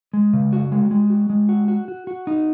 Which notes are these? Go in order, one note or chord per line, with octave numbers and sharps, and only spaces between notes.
G#3
C#3
F#4
G#3
G#3
F#4
G#3
F#4
F#4
F#4
F#4
D#4